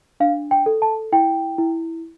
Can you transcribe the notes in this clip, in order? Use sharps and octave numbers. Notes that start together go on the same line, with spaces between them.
D4 F5
G5
A4
A5
E4 G5
E4